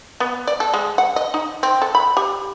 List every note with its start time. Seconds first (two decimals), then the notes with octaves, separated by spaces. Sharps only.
0.20 B3
0.47 D5
0.60 A4
0.74 G#3
0.98 F#5
1.16 D#5
1.34 D#4
1.63 C4
1.82 A4
1.95 B5
2.17 G4